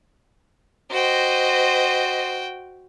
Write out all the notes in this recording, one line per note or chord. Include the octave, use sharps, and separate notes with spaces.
F#4 C5 D#5 G5